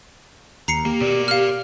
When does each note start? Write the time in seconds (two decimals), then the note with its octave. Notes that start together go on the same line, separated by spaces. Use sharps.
0.68 D#2 A#5 C7 C#7
0.85 A#3 G4
1.01 B2 A#4 D5
1.28 F5 F6